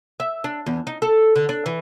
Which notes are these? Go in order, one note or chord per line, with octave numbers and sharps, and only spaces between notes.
E5
D4
E2
D#4
A4
D3
D4
E3